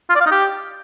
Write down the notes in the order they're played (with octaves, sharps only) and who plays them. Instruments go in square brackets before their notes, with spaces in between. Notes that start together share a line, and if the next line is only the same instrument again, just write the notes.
[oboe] F4
D5
F5
D#4
G4